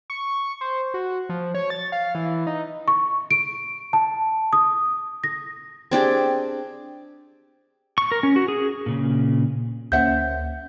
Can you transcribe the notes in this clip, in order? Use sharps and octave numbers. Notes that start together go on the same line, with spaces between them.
C#6
C5
F#4
F3
C#5
A6
F5
E3
D#4
C#6
D7
A5
D#6
A#6
C4 D4 G4 G#4
C#6
A#4
C#4
F#4
G#4
A#2 C#3
D2 A#3 C#4 C5 E5 F#5 G6